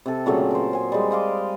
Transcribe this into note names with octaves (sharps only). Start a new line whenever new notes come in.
C3 A4
A#2 C#3 F#3 A3
A#4 C5
C5 G#5
G3 G#3
C5 D#5 F5 D6